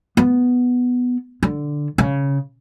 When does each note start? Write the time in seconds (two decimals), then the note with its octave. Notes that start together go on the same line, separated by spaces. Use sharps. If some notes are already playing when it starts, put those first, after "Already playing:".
0.17 B3
1.43 D3
1.98 C#3